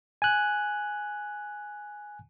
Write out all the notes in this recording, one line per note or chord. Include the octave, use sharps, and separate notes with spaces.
G#5 F#6